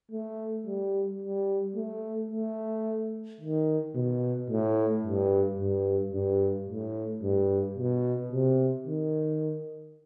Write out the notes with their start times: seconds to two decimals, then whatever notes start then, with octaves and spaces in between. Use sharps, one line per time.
0.12 A3
0.66 G3
1.22 G3
1.76 A3
2.31 A3
3.41 D#3
3.95 B2
4.50 A2
5.05 G2
5.59 G2
6.14 G2
6.69 A2
7.23 G2
7.77 B2
8.33 C3
8.87 D#3